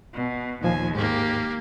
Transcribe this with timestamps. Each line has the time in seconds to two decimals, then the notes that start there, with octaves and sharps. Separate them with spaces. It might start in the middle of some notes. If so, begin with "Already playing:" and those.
0.13 B2
0.63 D#2 A#2 F3 G#5
0.95 G#2 A#3 G4